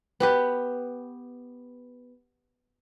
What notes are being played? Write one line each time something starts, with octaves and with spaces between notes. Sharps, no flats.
B3 G4 B4